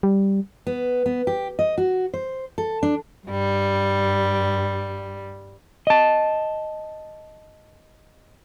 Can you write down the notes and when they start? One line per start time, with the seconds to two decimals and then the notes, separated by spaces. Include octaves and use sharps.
0.03 G3
0.67 B3
1.06 B3
1.27 G4
1.59 D#5
1.78 F#4
2.14 C5
2.58 A4
2.83 D4
3.27 G2 G3
5.87 D#5 A5